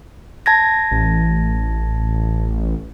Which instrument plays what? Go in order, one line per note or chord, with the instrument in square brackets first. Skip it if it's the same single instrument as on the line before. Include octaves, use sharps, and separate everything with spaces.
[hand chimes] A5 G#6 A#6
[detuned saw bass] A1